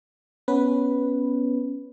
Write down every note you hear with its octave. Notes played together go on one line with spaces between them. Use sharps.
B3 C#4 B4